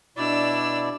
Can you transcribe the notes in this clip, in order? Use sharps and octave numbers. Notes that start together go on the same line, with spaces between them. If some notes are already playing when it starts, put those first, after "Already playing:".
B2 D4 E4 D5 E6